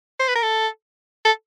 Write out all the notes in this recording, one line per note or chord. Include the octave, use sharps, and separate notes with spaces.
C5
B4
A#4
A4
A4